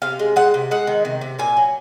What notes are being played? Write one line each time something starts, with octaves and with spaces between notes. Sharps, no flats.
C3 F5
G#3
G#3 F#5
C3
G#3 F#5
D#3
C3
C3
A#2 G#5
F#3